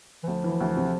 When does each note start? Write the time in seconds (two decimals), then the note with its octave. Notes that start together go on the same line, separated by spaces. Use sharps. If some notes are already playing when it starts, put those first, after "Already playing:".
0.23 E3
0.28 D2 F3
0.44 E3
0.61 D2
0.76 C3